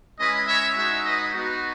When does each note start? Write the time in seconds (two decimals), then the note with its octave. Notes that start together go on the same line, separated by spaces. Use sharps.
0.18 G#3 C#4 E4 B4 D#5
0.46 C#5 E5
0.75 G#3 D#4 F#4 C#5 E5
1.04 B4 D#5
1.33 B3 D#4 F#4